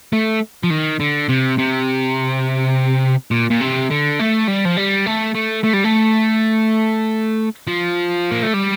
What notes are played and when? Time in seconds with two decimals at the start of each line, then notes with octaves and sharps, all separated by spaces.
0.13 A3
0.64 F3
0.70 D#3
1.00 D3
1.29 C3
1.58 C3
3.31 A#2
3.50 A#2
3.60 C3
3.90 D3
4.19 A3
4.47 G3
4.65 F3
4.77 G3
5.06 A3
5.35 A3
5.64 A3
5.73 G3
5.84 A3
7.67 F3
8.31 A#3
8.43 A3
8.54 G3